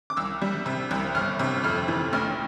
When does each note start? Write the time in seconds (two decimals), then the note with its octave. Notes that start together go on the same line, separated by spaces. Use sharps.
0.10 D6
0.17 C2 E6
0.42 G3
0.66 C3
0.91 C2
1.15 G1 F6
1.39 C3
1.64 F2 F6
1.88 E3
2.13 A1 F6